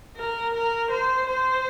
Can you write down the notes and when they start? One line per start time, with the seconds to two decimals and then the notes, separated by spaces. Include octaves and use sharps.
0.17 A#4
0.54 A#4
0.91 C5
1.26 C5